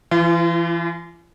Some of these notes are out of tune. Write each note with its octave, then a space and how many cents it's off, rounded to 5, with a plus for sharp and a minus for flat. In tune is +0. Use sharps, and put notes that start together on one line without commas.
E3 +30 F4 -35